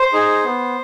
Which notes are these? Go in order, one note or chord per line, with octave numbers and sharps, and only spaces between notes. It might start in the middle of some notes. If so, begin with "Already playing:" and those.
Already playing: C5
D#4 G#4
B3